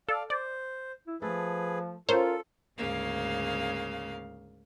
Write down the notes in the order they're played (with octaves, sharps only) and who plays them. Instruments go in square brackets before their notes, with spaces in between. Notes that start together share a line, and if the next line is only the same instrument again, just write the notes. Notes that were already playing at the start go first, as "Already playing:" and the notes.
[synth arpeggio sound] A4 [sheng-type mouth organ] D5 F5
[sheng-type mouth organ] C5 [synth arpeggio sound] D5
[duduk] E4
[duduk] F3 [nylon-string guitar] A3 A4 [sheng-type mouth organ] G#4 B4
[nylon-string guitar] C#4 A#4 [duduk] F4 [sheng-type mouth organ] A4 [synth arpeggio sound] C5 C#5
[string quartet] D2 G#2 C#3 A#3 F5